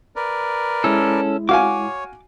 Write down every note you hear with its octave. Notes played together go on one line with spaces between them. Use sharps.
A#4 B4 D5
G#3 C#4 E4 A4
F#4 C#5 F5 G#5 D6